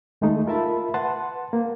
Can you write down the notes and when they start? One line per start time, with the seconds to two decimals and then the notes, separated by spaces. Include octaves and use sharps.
0.21 D#2 G#3 A3 D#4
0.47 F4 A#4 E5 A5 B5
0.94 B4 F#5 A5 C6
1.53 A#3